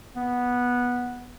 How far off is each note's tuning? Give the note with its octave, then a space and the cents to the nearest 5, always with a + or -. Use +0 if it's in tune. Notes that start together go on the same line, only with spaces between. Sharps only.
B3 -10